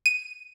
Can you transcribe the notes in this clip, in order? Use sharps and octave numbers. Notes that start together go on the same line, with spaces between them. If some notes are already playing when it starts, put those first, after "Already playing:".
D#7